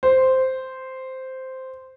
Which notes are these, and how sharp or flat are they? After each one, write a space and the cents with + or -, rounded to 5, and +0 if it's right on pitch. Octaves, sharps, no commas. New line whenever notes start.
C5 -5